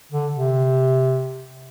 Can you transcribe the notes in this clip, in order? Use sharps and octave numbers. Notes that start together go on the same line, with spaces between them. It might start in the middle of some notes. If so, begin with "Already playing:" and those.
D3
C3